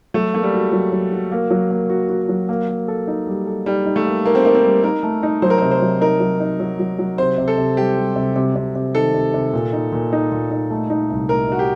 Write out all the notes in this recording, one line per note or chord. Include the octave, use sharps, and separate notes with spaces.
F#3 A3
A3 A#3
G3
F#4
F#3
F#3
F#4
A#3
F#3
A#3
F#4
F#4
F#3
A#3
A#3
A4
D#4
G3
A4
G3 D#4
D#4
A3
A#3
A#3 D#4
C4
A#3 D#4
C4
G3
D#4 A#4
A3
D#4
F#3 C5
A#4
C5
C3
C5
F#3
D#4 A#4
F#3
D#4
F#3
F#3
F#3
C3 C5
C3
A4
C3
G3 G4
G3
C3
C3
C3
C3
D#3 A4
C3
C3
A#2
D#4
A#2
D#4
A#2
D#4
A3
D#4
C2
A3 A#4
D#4 F#4
G4